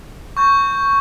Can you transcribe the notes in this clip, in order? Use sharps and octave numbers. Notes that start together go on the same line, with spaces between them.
C#6 G6